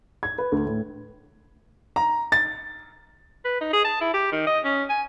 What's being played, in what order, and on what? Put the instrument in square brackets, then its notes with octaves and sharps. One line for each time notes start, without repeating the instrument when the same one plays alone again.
[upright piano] G#6
B4
D2
A2
[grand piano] A#5
A6
[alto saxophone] B4
D#4
G#4
A5
E4
G4
D#3
D#5
C#4
G#5